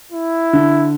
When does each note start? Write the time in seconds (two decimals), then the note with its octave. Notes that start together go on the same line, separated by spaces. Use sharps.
0.12 E4
0.53 D3